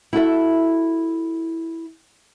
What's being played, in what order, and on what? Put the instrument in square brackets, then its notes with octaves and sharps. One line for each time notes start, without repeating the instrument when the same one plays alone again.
[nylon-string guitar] E4 F#4 A4 E5